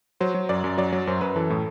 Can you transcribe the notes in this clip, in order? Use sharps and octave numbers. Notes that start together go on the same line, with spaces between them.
F#3 C5
F#3
F#2 D5
F#2
F#3 D5
F#3
F#2 C5
F#2 B4
E3 A4
A2